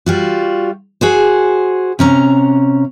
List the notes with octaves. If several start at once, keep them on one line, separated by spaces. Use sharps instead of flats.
G3 F4 F#4
F#4 G#4 C5
C3 C#4 A#5